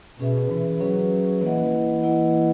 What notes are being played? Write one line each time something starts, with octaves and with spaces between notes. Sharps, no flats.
B2 C#4 G#4 B4 E5
E3
F#3 C#4 G#4 B4 E5
E3 A#3 E4 B4 D#5 F#5
E3
A#3 E4 B4 D#5 F#5